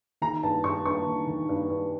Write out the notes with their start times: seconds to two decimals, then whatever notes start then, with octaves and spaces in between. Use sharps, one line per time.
0.22 D#3 A#5
0.43 G2 A5
0.64 G2 C#6
0.85 G2 C#6
1.07 D#3
1.27 D#3
1.49 G2
1.70 G2